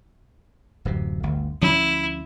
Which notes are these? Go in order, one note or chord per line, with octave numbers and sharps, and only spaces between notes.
D1 F#2 C3
G1 D2
D2 F3 C#4 E4